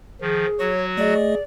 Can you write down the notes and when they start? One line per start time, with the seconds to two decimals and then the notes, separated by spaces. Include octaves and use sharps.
0.21 D#3 F3 G#4
0.59 F#3 F#4 C#5
0.97 A3 G#4 D5 D#5